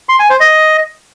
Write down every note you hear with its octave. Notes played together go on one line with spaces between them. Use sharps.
C6
G#5
C5
D#5